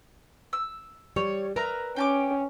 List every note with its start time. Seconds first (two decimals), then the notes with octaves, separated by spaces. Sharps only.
0.53 E6
1.16 G3 C#5
1.56 A#4 B4 E5 A#5
1.96 C#4 G5 A5 D6